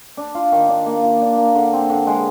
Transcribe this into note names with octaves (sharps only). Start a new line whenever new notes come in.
D4
F4
D#3
D4
A#3
F4
D4
A#3
D3
C4
D3
G#3